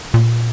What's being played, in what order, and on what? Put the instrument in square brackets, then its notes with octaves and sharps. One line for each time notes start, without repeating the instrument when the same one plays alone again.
[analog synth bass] A#2